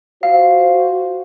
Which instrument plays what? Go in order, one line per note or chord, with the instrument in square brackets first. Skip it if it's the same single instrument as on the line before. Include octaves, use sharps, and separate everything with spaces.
[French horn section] F4 F#4 C5 [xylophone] F5